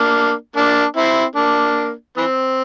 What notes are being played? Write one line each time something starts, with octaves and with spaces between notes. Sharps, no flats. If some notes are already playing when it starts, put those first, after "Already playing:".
Already playing: A#3 D4
A#3 D4
C4 E4
A#3 D4
E3 C4